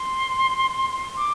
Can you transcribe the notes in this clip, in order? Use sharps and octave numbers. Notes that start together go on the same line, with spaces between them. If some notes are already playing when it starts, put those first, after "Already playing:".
Already playing: C6
D6